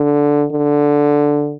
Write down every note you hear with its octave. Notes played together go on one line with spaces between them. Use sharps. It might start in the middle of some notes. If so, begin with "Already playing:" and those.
Already playing: D3
D3